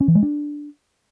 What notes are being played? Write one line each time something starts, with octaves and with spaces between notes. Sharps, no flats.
C#4
E3
G#3
D4